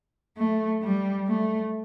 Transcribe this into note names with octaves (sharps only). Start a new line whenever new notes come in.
A3
G3
A3